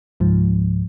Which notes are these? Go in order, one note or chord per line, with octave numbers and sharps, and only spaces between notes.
C#2 G#2 F3